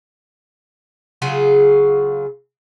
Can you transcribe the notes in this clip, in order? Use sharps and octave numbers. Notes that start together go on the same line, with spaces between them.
C#3 F#3 F4 G#4